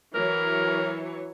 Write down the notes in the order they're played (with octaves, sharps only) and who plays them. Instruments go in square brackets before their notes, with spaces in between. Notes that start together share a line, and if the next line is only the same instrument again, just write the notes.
[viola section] E3 F#3 C#5 [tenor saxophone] A#4